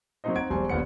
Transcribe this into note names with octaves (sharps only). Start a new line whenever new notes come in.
F#3 A#3 C4 D#4 C5 D#5
C4 D#4 F#5 G#6 D7
E1 F#3 G3 C5 G#5
D#1 A#1 D#2 B3 F#5 C#7